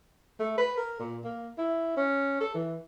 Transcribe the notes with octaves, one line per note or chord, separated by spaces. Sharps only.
A3
B4
A#4
A#2
A#3
E4
C#4
A4
E3